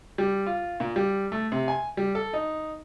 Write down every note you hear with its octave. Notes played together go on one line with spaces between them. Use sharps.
G3
F4
A#2
G3
A3
C3
G#5
G3
A4
D#4